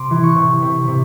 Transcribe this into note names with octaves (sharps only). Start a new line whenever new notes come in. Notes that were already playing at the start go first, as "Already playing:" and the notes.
Already playing: C3 C6 D6
E3
C#6
C3
C3
C3